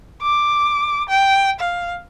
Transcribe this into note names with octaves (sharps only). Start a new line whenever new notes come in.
D6
G5
F5